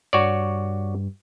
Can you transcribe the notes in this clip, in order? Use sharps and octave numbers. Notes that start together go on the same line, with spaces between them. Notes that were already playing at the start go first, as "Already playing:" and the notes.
G2 F#4 C#5 D5